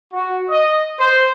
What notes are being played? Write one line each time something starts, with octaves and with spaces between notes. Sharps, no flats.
F#4
D#5
C5